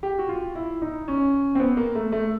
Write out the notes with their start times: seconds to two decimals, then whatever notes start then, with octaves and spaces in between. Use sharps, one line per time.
0.03 G4
0.19 F#4
0.29 F4
0.55 E4
0.82 D#4
1.08 C#4
1.55 C4
1.60 B3
1.77 A#3
1.95 A3
2.12 A3